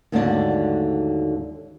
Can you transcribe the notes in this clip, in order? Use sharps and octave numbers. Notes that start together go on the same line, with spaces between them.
D#2 G#2 D3 F#3 A3 D4